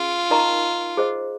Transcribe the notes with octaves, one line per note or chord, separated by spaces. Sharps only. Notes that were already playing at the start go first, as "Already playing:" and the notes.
Already playing: C#4 F4 G#4
D#4 A#4 D#5 A#5 C#6
G#4 C5 D#5